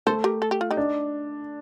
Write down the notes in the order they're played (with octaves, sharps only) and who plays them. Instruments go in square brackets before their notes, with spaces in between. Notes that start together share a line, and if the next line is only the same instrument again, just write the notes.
[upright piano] A3 [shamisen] A4 C5
[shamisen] G4 A#4
A4
G4
F4
D#4 G4
[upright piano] D4